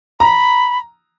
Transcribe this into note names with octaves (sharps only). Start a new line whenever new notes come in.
A#5 B5